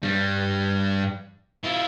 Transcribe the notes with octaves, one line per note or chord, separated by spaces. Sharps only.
G2 G3
E4 F4